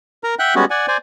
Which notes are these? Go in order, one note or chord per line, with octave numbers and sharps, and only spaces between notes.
A#4 A#5
E5 F#5 G5 F#6
G3 G#3 B3 C#4 F#4
D5 F#5 G#5
C5 D5 G#5